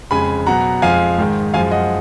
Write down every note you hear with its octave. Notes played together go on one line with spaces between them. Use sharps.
F2 C#3 G#3 G#5 B5
B2 F#3 F#5 A#5
F2 F3 G#3 F5 G#5
G#2 D#3 G#3
F#2 F3 G#3 F5 G#5
D#5 F#5